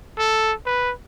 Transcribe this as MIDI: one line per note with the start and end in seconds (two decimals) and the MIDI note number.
0.19 0.53 69
0.66 0.93 71